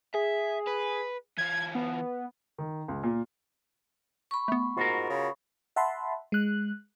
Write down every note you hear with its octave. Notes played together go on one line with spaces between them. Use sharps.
G#4 E5
B4
E3 F4 G#6
B3
D#3
C#2
A#2
B5 C#6
A3 B3
G#2 F4 F#4 A#4
C#3
E5 F#5 A5 B5 C6
G#3 F#6